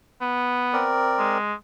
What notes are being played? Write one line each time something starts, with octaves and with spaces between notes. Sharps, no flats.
B3
C4 A#4 D5
G#3